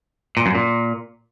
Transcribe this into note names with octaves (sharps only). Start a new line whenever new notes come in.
A#2
F#2
A#2